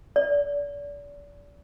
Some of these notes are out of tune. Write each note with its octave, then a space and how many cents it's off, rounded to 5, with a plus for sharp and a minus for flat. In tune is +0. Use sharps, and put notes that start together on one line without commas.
D5 -35